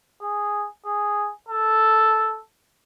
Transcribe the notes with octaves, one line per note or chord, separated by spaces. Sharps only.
G#4
G#4
A4